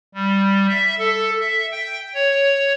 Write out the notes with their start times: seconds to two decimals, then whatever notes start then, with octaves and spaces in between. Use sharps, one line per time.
0.14 G3
0.69 E5
0.99 A4
1.40 E5
1.72 G5
2.14 C#5